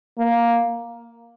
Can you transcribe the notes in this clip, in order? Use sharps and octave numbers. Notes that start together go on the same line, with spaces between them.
A#3